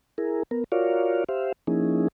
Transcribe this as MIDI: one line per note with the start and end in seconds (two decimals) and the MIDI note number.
0.18 0.43 64
0.18 0.43 68
0.18 0.43 70
0.51 0.64 59
0.51 0.64 70
0.72 1.24 65
0.72 1.24 66
0.72 1.24 70
0.72 1.24 73
0.72 1.24 74
0.72 1.24 77
1.29 1.52 67
1.29 1.52 72
1.29 1.52 76
1.29 1.52 77
1.67 2.08 53
1.67 2.08 58
1.67 2.08 61
1.67 2.08 63
1.67 2.08 64
1.67 2.08 68